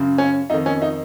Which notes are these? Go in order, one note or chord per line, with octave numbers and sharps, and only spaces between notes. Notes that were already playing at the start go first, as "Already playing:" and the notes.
Already playing: F#2 C#3
C#4
F2 D#3 D#4
C#4
D#4